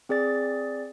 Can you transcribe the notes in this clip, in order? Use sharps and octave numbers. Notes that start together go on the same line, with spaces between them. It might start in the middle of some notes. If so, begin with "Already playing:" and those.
C4 G#4 D5 A6